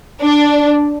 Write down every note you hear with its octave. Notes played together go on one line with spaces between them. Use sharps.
D4